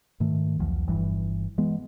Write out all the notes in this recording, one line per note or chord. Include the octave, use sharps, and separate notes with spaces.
G#2 D#3 A3
B1 E2 F3
G1 G2 E3
E3 G#3 B3